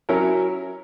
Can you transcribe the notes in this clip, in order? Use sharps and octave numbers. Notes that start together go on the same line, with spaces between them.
F#3 C#4 E4 A#4